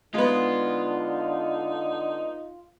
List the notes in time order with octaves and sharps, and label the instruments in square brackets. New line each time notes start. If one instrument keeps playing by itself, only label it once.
[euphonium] D3 [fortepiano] G#3 B3 [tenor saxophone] D#4 [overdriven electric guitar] F4